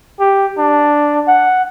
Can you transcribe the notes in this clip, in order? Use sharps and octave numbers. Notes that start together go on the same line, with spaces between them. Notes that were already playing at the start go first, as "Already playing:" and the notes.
G4
D4
F#5